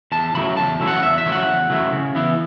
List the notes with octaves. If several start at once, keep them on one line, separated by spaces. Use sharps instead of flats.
E2 A5
C#3 F#3 A3 E4 B5
E2 A5
C#3 F#3 A3 E4
F#5
E2 E5
E5
C#3 F#3 A3 E4
F#5
E2
C#3 F#3 A3 E4
C#3
E3 B3 E4